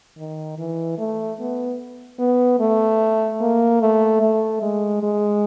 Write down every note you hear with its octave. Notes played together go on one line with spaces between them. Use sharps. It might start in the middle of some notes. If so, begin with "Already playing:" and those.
D#3
E3
A3
B3
B3
A3
A#3
A3
A3
G#3
G#3